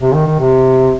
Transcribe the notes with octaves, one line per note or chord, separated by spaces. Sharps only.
C3
D#3
D#3
C3